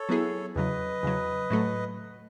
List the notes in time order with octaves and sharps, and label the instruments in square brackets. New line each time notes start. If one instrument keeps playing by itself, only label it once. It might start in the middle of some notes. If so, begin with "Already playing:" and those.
Already playing: [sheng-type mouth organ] A4 C#5
[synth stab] F#3 B3 E4 G#4
[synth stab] E2 C#3 F#3 [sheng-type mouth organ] B4 D#5
[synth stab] E2 C#3 F#3
A2 F#3 A3